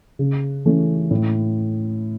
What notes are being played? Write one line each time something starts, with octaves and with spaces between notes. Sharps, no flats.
C#3
E3 A3 C#4
A2